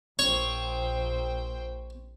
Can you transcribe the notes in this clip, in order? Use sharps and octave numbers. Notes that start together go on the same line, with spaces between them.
A#1 C5 C#5 G5 C#6